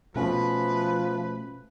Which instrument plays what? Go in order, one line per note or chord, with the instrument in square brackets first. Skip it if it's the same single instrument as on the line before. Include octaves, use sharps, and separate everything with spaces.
[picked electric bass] B2 A3 C#4 [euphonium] F3 [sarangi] B4